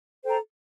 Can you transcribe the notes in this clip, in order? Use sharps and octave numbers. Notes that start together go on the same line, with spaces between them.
A4 C5 G5 A#5